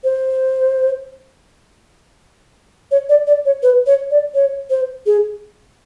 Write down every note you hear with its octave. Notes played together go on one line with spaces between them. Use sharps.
C5
C#5
D5
D5
C#5
B4
C#5
D5
C#5
C5
G#4